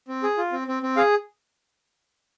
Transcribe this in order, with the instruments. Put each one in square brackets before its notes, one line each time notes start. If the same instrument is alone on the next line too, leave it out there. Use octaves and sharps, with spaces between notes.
[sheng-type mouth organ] C4
G#4
F4
C4
C4
C4
G#4 F5